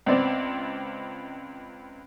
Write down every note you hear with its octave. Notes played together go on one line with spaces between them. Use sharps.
C#2 B3 C4 D5